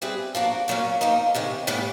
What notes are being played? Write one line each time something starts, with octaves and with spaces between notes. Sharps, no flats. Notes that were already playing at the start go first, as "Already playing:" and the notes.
G3 C4 E4 G#4 B4
F3 A#3 D4 F#4
A#2 F#3 A#3 C#4
F3 A#3 D#4
C3 D#3 G#3 C#4
A2 E3 G3 B3